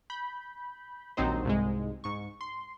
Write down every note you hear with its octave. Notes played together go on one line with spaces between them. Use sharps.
B5 G6
A#1 D#2 F#3 C4 D#4 C5
C2 G#2 G#3
G#2 C#6
C6